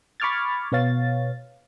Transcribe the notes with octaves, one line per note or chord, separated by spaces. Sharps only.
B5 C#6 D6 F6 G#6 A6
B2 B3 C#5 F5 A6